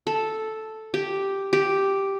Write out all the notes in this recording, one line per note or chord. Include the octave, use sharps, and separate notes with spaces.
A4
G4
G4